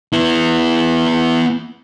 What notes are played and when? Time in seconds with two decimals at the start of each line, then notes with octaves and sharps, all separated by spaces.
0.12 B3 E4